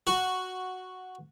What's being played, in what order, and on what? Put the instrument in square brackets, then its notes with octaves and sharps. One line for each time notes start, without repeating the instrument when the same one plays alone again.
[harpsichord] F#4